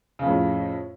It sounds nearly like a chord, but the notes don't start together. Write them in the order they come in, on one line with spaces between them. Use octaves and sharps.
C#3 F2 A2